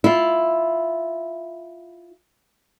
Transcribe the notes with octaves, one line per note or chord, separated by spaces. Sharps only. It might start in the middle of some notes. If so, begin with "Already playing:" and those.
E4 F4